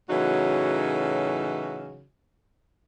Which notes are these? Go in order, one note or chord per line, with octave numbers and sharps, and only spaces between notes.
A2 C#3 E3 F#3 D#4 F#4